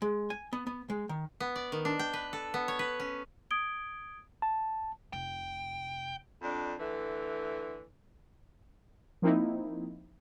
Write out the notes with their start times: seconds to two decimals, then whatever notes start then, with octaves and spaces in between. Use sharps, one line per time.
0.02 G#3
0.30 G#5
0.53 B3
0.67 B3
0.90 G#3
1.09 D#3
1.40 B3
1.56 D5
1.72 D#3
1.85 D4
1.99 G5
2.13 B4
2.33 A4
2.54 B3
2.68 C#5
2.79 B4
3.00 C#4
3.51 D#6 G#6 D7 G7
4.42 A5
5.13 F1 C3 G5
6.43 F2 D4
6.78 D3 E3 A3
9.22 F3 A#3 C4 D#4 E4